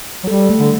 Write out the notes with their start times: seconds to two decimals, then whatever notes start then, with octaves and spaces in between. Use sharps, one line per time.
0.24 F#3
0.27 G3 A4
0.49 A3
0.59 D3